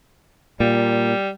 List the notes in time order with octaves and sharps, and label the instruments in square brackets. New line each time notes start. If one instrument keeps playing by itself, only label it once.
[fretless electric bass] A#2 [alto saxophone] G3